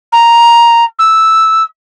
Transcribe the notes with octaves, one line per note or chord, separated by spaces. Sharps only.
A#5
E6